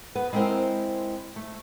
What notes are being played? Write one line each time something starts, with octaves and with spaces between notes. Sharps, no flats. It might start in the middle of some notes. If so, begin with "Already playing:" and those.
B3 B4
G#3 C4 E4 A#4 C5 G5
A3